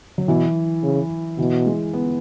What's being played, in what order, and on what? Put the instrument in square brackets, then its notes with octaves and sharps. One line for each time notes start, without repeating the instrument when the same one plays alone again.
[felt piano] F#3
[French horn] B2 [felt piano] E3
[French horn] C#3
[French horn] B2 [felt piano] E3
[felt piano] G#3
B3